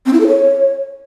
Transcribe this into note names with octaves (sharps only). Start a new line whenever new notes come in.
C4
E4
A4
C#5